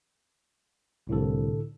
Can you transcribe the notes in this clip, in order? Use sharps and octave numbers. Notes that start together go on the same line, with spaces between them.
C2 A2 D3 A4